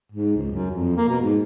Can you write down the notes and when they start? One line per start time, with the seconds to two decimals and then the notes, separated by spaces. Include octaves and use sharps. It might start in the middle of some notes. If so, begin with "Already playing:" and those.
0.12 G#2
0.37 C#2
0.52 F#2
0.71 F2
0.97 A#3
1.08 B2
1.22 G#2